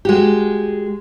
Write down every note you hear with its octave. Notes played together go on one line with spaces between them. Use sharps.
G#3 F#4 G4